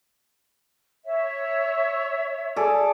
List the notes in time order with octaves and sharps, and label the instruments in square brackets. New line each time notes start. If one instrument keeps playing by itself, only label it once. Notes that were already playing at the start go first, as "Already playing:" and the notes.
[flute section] C#5 E5
[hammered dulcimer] G#4 A4 D5